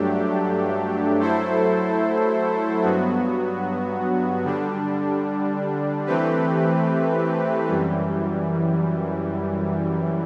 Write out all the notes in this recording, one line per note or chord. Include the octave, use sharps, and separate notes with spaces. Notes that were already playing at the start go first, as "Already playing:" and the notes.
Already playing: G2 F#3 A3 D4 G4
F#3 A3 E4 A4 C5
G2 F#3 B3 F#4
D3 G3 D4
E3 A3 C4 G4 B4
F#2 E3 G3